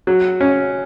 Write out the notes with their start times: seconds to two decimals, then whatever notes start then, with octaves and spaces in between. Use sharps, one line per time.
0.07 F#3
0.41 C#4